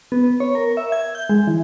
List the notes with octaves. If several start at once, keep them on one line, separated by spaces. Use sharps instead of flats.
B3
B3
C#5
A#4
E5
G#6
G6
G#3
E3